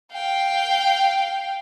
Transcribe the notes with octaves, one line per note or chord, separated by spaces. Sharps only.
F5 G5